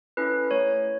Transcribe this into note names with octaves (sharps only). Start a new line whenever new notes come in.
C#4 E4 A4 B4
A3 C#5